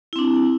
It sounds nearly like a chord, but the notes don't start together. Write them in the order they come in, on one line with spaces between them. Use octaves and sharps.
E4 C4 D4